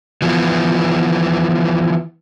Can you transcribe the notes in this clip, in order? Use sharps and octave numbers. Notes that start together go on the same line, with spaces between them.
E3 F3 B3